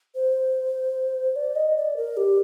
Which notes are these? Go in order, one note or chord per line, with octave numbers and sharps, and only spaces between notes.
C5
D5
D#5
D5
A#4
G4